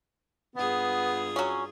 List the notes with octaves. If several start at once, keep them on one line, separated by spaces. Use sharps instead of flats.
G2 B3 F4 G#4
F#3 C#4